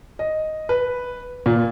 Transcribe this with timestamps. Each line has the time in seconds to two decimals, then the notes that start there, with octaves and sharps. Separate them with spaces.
0.19 D#5
0.69 B4
1.46 A#2